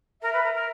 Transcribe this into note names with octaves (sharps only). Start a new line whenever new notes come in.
A#4 E5
B4
A#4
A#4